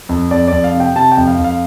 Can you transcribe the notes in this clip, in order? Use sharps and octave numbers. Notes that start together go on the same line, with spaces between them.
F2
F2 D5
F2 D5
F5
C3
G5
C3 A5
G5
F2
F5
F2
F5